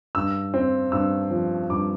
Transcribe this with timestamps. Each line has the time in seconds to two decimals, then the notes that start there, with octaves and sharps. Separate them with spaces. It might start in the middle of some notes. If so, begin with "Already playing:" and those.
0.15 G2 E6
0.54 C4
0.92 G2 E6
1.31 F3
1.70 G2 D6